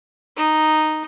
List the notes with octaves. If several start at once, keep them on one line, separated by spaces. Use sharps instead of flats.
D#4